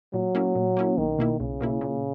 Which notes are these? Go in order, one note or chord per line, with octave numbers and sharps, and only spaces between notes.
A#2 F#3
A#3 C#4 E4
A#2
A#3 C#4 E4
B1 D#3
B2 A#3 E4
B1 C#3
B2 A#3 E4
A#2